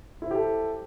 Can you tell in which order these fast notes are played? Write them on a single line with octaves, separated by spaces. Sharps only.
E4 C5 G4 A4